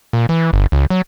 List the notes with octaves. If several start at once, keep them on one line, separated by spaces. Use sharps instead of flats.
A#2
E3
G1
C#2
F#3